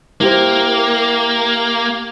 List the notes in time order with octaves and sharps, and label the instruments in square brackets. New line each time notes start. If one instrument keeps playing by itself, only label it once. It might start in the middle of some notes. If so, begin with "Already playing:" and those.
[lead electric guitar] A#3 [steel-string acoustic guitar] E4 G4 C5